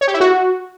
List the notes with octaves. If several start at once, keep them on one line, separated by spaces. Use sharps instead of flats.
C#5
G4
E4
F#4